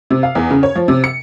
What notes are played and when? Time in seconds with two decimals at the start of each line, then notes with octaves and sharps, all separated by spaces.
0.10 C3
0.23 F5
0.35 E2
0.50 C#3
0.63 C#5
0.75 F3
0.88 C3
1.04 C#7